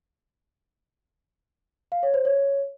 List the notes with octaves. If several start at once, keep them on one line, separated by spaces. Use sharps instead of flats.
F5
C#5
C5
C#5